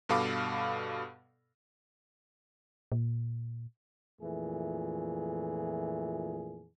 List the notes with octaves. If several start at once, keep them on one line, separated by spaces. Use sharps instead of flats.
G2 B2 A4 F5 B5 D6
A#2
F2 A#2 E3 A3 G#4